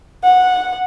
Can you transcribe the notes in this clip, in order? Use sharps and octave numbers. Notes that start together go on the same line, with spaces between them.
F#5